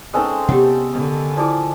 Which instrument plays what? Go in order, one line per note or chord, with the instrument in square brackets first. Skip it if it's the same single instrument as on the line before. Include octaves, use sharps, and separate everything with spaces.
[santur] G#3 C#4 A4 [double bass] C4 [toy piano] D#4 B4 E6
[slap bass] C3 B3 [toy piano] G4 C#5 F#5
[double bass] D3 D#3
[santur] F3 D6 [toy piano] E4 G#4 D5